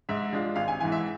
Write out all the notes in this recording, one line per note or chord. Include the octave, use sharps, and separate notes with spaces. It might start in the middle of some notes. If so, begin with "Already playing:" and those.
G#2 E5
G#3 D4 F4
G#1 F5
G#5
G#2 E3 G#5
E5